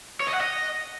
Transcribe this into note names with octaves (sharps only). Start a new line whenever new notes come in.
C#5
D#5
F#5
D#5